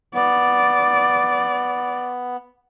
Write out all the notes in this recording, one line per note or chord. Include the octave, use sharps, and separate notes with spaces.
B3 D5